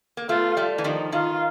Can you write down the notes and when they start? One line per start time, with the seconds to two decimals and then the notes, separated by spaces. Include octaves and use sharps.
0.17 A#3
0.29 A3 B3 F4
0.57 G3 A3
0.78 E3
0.84 D#3 F3
1.12 D#3 F4